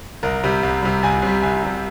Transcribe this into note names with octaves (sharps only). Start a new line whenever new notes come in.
C2 A#4
C3 G3
C2
C3 G3
C2 G#5
C3 G3
C2 G#5
C3 G3